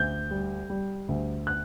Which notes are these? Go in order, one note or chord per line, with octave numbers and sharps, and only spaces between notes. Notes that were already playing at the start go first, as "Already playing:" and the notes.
Already playing: D2 G6
G3
G3
D2
F#6